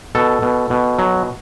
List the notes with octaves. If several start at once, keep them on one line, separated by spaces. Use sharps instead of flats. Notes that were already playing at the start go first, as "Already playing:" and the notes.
B2 A4
B2
B2
F#3